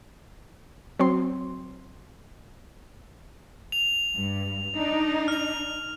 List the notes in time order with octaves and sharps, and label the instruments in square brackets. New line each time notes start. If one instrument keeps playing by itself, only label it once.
[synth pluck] F#3 C4 C6
[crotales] F7
[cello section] G2
D4 D#4
[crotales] F6 F7